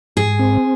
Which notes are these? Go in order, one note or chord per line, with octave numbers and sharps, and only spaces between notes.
G#2 G#4
C4